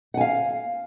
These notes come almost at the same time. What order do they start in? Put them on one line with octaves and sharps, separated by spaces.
F#5 G#5 F5